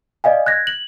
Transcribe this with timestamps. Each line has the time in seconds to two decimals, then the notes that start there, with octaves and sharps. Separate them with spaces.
0.24 D5 D#5 F5 G#5
0.46 F#6 G#6 A#6
0.67 F#7